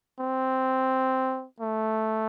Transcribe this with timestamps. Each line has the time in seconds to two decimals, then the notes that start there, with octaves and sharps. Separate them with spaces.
0.19 C4
1.60 A3